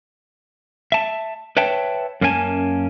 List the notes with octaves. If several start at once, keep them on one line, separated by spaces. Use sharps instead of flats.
E5 A5
B4 C#5 E5 G5 A5
F#2 A#3 C#4 F4 G#5 A5